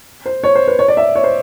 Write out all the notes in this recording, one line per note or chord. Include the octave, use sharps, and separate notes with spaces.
C5
C#5
C5
B4
C#5
D5
E5
C#5
C5